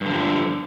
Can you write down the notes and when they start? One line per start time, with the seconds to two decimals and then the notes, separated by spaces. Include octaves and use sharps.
0.01 G2
0.06 D3
0.10 F3